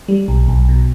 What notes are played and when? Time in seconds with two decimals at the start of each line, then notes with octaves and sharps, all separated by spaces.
0.08 G3
0.28 B1
0.48 B1
0.69 B2